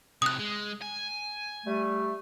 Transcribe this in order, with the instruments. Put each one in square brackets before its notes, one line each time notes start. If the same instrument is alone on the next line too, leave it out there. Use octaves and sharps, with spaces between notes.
[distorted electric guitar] A2 C3 [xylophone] D#6 F#6
[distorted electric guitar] G#3
G#5
[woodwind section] G3 A3